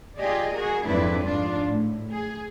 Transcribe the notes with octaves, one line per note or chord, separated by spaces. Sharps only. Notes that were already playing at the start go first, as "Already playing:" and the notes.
F4 G4 G#4 D5 D#5
F#4 G#4 A#4
F2 G#2 D4 E4 B4 D5
G#2 D4 F4 D5
A2
G#4